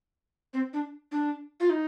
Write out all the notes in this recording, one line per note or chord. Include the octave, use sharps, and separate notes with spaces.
C4
D4
D4
F4
D#4